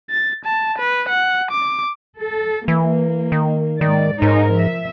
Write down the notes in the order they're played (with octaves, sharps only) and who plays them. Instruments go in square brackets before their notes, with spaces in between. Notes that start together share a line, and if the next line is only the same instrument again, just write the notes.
[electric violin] A6
A5
B4
F#5
D6
[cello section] A4
[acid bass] E3 [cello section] A#3
[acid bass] D#3
[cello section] G#2 D5 [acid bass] D#3
[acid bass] G#2 [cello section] D#4 A#4 C#5
[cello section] F3 E5